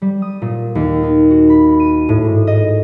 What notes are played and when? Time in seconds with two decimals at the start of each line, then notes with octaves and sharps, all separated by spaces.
0.02 G3
0.22 D#6
0.42 A#2
0.75 D#2
1.03 D#4
1.30 F#4
1.50 B5
1.80 D#7
2.09 A2
2.24 G#2
2.47 D#5